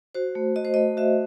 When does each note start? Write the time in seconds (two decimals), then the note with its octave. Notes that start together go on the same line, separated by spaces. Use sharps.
0.15 F#4 C5
0.35 A3
0.56 F#4 D#5
0.65 C5
0.74 A3 D#5
0.97 F#4 E5